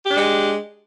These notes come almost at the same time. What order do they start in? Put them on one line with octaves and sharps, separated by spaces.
G4 D4 G#3